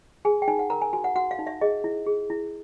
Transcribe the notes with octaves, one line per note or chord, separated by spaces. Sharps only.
G#4 G#5
G5
D#4 G#5
F#5
A#4 A#5
G#5
F#4 G#5
F#5
F#4 F#5
F5
D#4
E5
G#4 D#5
E4
G#4
E4